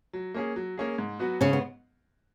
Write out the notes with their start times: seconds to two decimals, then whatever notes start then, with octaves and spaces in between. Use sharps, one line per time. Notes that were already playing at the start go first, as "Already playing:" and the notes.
0.13 F#3
0.34 A#3 C#4 G#4
0.56 F#3
0.78 A#3 C#4 G#4
0.98 G#2
1.19 F#3 B3 F#4
1.41 G#2 C#3 C#4
1.53 B3